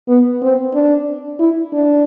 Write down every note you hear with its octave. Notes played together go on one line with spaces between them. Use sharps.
B3
C4
D4
E4
D4